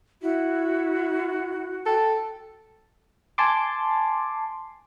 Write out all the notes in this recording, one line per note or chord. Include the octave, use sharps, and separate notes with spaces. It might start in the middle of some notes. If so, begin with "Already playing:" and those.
E4 F#4
A4 G5
G#5 A5 C6 D6